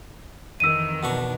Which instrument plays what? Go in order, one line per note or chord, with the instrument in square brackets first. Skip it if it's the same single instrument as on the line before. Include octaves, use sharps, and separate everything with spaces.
[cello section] F2 D#3 E3 [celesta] E6 D#7
[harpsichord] B2 D4 C#6